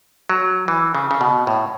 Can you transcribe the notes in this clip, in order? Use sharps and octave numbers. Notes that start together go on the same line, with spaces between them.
F#3
E3
C#3
C#3
B2
A2